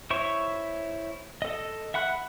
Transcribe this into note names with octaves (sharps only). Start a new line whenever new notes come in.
E4 C5 C#5 E5 C#6
A4 D#5
E5 F#5 B5 F#6